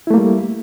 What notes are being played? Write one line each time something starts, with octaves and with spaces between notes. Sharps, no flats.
G3 A3 A#3 E4